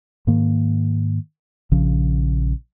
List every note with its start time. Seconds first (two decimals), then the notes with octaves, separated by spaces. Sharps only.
0.27 G#2 D#3 A#3
1.72 A#1 C#3 F3